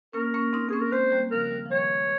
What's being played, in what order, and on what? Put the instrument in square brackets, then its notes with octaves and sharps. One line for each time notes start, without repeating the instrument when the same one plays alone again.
[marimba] A#3 C#4 [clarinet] A#4
[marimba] A#3 C#4
C4 D#4
[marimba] A#3 C4 C#4 [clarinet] G#4
[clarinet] A#4
[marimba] G#3 C4 [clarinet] C5
[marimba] G3 A#3
[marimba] C#3 F3 [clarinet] A#4
[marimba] D#3 G3
F3
[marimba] D#3 G3 [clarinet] C#5
[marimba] G#3